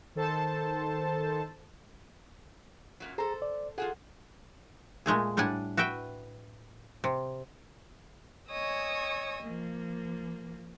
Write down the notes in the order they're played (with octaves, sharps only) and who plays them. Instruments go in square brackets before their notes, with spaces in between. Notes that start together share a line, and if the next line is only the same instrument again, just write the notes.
[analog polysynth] D#3 A4 C5 A5
[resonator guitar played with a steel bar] F#2 A#2 F#3
[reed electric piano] G#4 A#5 [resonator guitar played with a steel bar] A4 C5
[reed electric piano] D5
[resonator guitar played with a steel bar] F4 F#4 G#4 [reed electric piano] A4 F#5
[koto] A#2 G#3 A3 G#4
A2 G3 D4 F#5 G#5
F#4 B4 E5 G5
C3
[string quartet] C#5 D#5 G#5 C#6 D#6 E6
F3 A#3